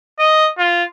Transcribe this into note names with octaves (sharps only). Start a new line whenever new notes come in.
D#5
F4